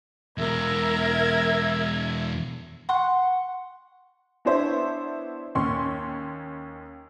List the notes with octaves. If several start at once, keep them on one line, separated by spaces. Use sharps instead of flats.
E2 B2 A#4 E5 G#6 A#6
F#5 C6 C#6 F#6
B3 D4 E4 C5 C#5 E5
D#2 C#4 C6 C#6